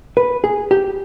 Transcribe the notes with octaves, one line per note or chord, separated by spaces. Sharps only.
B4
G#4
G4